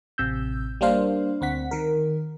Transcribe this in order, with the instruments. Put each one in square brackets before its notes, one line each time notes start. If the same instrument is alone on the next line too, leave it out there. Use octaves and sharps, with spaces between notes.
[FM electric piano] A1 C3 E6 G6
G3 A#3 D4 C5 F5
D2 C4 F#5 B6
D#3 A#4